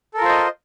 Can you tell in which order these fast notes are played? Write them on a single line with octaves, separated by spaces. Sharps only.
A4 A#4 F4 C5 D#5